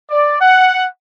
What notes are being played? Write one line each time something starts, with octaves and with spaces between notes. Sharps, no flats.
D5
F#5